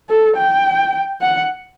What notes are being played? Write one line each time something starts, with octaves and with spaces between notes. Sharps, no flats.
A4
G5
F#5